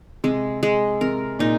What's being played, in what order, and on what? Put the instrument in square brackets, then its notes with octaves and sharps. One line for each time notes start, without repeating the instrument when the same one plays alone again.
[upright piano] C3 [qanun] G#3
[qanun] G#3
[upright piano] C3 [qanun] A#4
[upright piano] A#2 [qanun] D#4